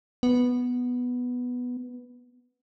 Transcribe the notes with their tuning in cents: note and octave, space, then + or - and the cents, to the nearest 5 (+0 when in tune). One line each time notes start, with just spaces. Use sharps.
B3 +0